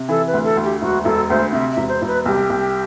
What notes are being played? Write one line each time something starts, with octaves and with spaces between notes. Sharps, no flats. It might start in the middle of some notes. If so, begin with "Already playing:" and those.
Already playing: C3
E3 A4
B4
D2
A4
D2
G4
E1 F#4
E1 A4
D2 C5
C3 E5
E5
E1
C5
E1
B4
C2 G4
C2